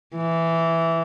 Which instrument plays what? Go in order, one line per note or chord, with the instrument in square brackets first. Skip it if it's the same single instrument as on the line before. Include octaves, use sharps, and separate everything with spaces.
[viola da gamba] E3